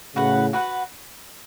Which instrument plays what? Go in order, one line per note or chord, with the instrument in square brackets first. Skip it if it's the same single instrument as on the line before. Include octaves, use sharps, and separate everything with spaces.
[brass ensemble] A2 C#3 [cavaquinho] F#4 B4 F#5
[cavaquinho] F#4 B4 F#5